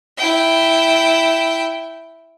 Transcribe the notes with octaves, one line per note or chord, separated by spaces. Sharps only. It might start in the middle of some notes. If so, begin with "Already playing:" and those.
E4 G5